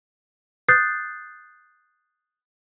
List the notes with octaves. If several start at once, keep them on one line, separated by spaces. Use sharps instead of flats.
D#6 F#6 G6 A6 C7